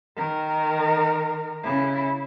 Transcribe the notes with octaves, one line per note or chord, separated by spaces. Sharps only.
D#3 A#4
C#3 E4